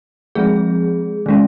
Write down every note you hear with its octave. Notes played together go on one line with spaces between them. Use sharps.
F3 G#3 C4 G#4
D#3 G#3 C#4